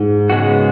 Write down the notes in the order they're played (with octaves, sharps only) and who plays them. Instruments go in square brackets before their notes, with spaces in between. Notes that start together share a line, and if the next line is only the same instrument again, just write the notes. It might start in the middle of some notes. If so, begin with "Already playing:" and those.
Already playing: [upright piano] G#2
[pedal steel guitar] C#3 G#3 B3 F#4